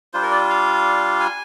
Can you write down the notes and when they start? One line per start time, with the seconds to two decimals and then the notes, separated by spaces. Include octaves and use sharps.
0.14 G3 D4 F4 C5
0.23 A#4
0.31 D5
0.50 F5
1.20 G#5